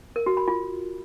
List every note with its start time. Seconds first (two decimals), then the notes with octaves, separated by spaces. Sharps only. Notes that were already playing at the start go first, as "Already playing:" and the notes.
0.16 A#4
0.26 F#4
0.37 B5
0.48 F4